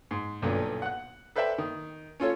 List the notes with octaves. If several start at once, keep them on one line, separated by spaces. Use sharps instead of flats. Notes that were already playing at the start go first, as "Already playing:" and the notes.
G#2
B1 G2 A#2 D3
F#5 F#6
A4 B4 C5 D5 E5 G5
D#3
C#4 F4 A4 C#5